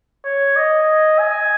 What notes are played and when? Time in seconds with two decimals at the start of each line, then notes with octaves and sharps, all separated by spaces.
0.25 C#5
0.56 D#5
1.19 G#5